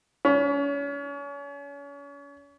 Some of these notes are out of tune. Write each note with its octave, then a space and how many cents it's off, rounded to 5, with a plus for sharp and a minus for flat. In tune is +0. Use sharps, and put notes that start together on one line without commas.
C#4 +35